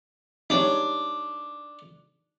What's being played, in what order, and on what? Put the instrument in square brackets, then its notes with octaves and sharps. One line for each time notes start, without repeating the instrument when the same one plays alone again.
[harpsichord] D4 [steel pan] D#4 G4 C#5